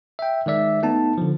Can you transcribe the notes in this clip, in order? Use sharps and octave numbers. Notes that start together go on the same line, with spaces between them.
E5 G5
D#3 G#3 D5 E5
A3 B3 D#4 A5
D3 F3